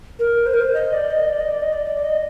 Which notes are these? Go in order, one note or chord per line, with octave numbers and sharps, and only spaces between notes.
A#4
C5
A#4
C5
D#5
D5
D#5
D5
D#5
D5
D#5
D5
D5
D5
D#5